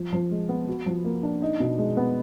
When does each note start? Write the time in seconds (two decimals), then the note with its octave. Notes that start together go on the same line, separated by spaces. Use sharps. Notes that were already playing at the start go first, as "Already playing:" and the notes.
Already playing: F3
0.13 F3
0.31 G#3
0.49 B3
0.68 F#4
0.86 F3
1.04 A#3
1.23 D4
1.42 D#4
1.60 B2
1.78 G#3
1.97 B3